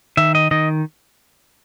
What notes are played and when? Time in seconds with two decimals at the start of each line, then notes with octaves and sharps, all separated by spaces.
0.17 D#3 E5
0.35 D#5
0.51 D#3 D#5